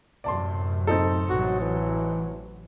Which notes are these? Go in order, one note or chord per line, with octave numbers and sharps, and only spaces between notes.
F#2 A2 C3 D5 A5 C6
C4 D#4 A4
A1 C3 F#3 F#4
E3